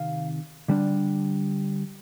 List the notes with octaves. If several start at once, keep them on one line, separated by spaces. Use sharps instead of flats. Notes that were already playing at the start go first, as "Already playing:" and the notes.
Already playing: C3 D#3 F5
D3 G3 D4